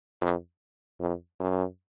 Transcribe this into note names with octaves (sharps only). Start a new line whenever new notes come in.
F2
F2
F#2